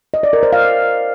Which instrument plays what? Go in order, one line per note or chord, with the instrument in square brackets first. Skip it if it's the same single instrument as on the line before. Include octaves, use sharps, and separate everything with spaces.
[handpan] D#5
D5
A#4
C5
F5